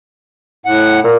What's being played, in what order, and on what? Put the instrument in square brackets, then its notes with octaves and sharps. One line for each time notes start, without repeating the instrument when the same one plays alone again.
[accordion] A2 F#5
[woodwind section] A#2